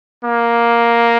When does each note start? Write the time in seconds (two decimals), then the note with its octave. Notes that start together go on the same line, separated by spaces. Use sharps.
0.24 A#3